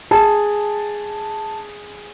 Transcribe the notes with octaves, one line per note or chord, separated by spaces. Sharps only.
G#4 A5